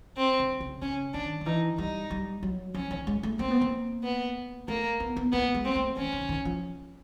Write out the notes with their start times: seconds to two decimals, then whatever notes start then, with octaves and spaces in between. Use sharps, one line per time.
0.17 C4
0.39 D3
0.60 C#3
0.82 C#3 C#4
1.14 D#3 D4
1.41 D#3
1.46 E3 D#4
1.78 G3 D#4
2.11 G3
2.43 F#3
2.74 F3 C#4
2.91 D#3
3.07 G#3
3.23 A3
3.39 A#3 C4
3.51 B3
3.61 A#3
4.03 B3
4.68 A3 A#3
5.00 B3
5.16 B3
5.32 A#3 B3
5.54 G#3
5.65 C4
5.76 A3
5.97 E3 C#4
6.13 D#3
6.29 D#3
6.45 F3